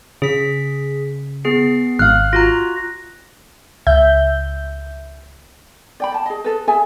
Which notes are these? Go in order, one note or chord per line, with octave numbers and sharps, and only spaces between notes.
C#3 G#4 B6
B3 G#4 C7
G#1 F5 F6 F#6
F4 F#4 A#5 A#6
C#2 E5 G6
D5 G5 B5
D5 A5
G#4 D#5
G#4 A4 B4
G#4 A4 E5 G#5